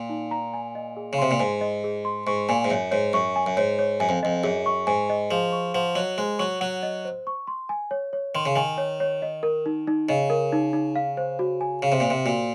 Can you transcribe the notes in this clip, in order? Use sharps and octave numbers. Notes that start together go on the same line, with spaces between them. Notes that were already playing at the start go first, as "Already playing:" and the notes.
Already playing: A#2
D#4
A#5
G#5
D#5
G#4
C#3
C3 C6
A#2
G#2 G#5
D#5
G#4
C6
G#2 C#6
A#2 G#5
G#2
F#2 C#5
G#2 C#5
F#2 C#6
G#5
F#2
G#2 C#5
C#5
F#2 G#5
F2
F2 D#5
F#2 G#4
C#6
G#2 G#5
D#5
F3 G#4
C#6
F3 F#5
F#3 D#5
G#3 C5
F#3 C#6
F#3 F#5
D#5
C5
C#6
C6
G#5
C#5
C#5
D#3 C6
C#3
D#3 G#5
C#5
C#5
D#5
A#4
D#4
D#4
C#3 D#5
A#4
D#4
D#4
F5
C5
F#4
G#5
C#3 F5
C3
A#2
C5
C3
A#2 F#4